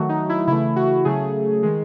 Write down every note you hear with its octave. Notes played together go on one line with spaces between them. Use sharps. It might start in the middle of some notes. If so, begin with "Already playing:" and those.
Already playing: D#3 F#3 A3 F#4
D#4
E4
C#3 E3 A3 E4
F#4
C#3 F#3 A3 G#4
D#3 G#3